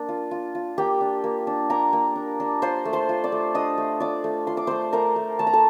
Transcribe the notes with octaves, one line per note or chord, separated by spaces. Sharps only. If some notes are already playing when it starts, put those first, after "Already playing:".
Already playing: A#3 D4
F4
F4
F4
A#3 G4 G5
D4
A#3
D4
A#3 A#4 A#5
A#3
D4
D4
F4 C5 C6
A3
C5 C6
F4
D5 D6
A3
D4 D#5 D#6
A3
F4 D5 D6
A3
F4 C6
D6
A3 C5 C6
A3 A#4 A#5
A3
A3 A5
A#5
A4 A5